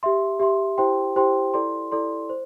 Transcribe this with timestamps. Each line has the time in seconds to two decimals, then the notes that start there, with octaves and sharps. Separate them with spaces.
0.03 G4 E5 C6
0.40 G4 E5 C6
0.78 E4 G4 C5 G5 C6
1.16 E4 G4 C5 G5 C6
1.54 E4 A4 D5 C6
1.92 E4 A4 D5 C6
2.30 C5